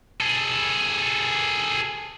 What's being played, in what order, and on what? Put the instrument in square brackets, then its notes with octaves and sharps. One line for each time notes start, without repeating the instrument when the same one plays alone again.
[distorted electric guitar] G#4 A4